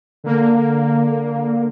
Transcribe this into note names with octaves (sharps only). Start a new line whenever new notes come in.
D3 A#3